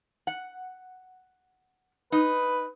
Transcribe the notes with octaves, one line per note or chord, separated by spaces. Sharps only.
F#5
D#4 B4